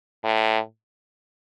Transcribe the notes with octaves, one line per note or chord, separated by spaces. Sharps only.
A2